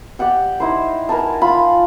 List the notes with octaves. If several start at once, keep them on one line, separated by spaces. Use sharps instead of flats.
G4 D5 F#5 G5
D#4 E4 C5
A#4 B4 G#5 A5
F4 B5